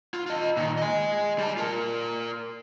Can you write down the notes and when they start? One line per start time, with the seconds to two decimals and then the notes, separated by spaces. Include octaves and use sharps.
0.14 F4
0.26 F4 D#5
0.57 A#2 D#3
0.78 D#5 G#5
1.38 G3 A5
1.57 F4 A#4